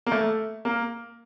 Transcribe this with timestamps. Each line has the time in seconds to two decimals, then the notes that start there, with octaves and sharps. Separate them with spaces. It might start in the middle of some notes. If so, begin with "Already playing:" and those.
0.06 A#3
0.12 A3
0.65 A#3